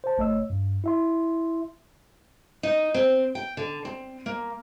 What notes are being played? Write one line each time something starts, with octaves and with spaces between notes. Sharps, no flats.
C5 A5
G1 A3 C#5 D#5 E6
G2
E4 E5 C6
D#4
C4
G5
D3
C4
A#3